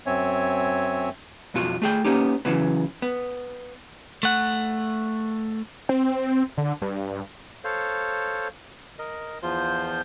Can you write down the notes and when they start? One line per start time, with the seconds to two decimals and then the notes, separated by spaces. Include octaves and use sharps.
0.06 F#2 C4 C#5 E5 G#5
1.54 B1 F2 B2 F4 F#4
1.82 A3 G#4 G5
2.05 A#3 B3 C#4 D#4 G4
2.45 C#3 E3 F#3 B3
3.02 B3
4.23 A3 F#5
5.89 C4
6.57 D3
6.82 G2
7.64 A4 C5 C#5 F5
8.99 A#4 D#5
9.43 E2 F3 F4 C5 G6